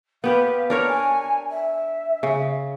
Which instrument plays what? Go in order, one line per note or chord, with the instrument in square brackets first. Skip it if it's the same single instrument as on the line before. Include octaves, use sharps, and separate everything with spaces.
[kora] B3 G4 B4 [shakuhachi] F5
[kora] D4 A#4 C#5 [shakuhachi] B4
[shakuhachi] G#5
E5
[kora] C#3